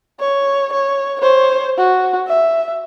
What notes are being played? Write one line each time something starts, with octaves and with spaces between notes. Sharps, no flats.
C#5
C#5
C5 C#5
F#4
E5